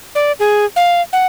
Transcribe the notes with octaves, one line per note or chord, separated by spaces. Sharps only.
D5
G#4
F5
F#5